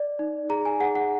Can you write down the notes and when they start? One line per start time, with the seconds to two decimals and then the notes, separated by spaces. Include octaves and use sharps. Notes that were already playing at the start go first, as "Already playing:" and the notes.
Already playing: D5
0.19 D#4
0.49 G#4 A#5
0.65 G#5
0.80 G#4 F#5
0.95 F#5